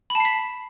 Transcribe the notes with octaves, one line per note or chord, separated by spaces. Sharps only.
B5
A5
C7
B6